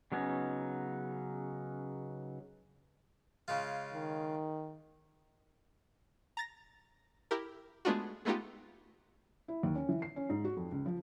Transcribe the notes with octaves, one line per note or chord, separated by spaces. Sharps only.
C#3 F#3 B3 C#4 D#4
C#3 G#3 F4
D#3
A#5 A6 A#6
E4 G4 A#4
G#3 A3 B3 D4 F4 F#4
G#3 A3 B3 D#4 F4 G4
E4
D#2
C#4
E3
C7
C#4
G#2
F#4
F2
C#2
F3